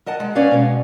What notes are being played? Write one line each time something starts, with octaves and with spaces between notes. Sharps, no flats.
A#4 D#5 F#5 A5
G#3
B3 C#4 B4 D5 F5
B2 G#3